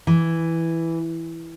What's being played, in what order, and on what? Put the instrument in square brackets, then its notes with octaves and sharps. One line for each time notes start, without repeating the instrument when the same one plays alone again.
[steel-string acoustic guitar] E3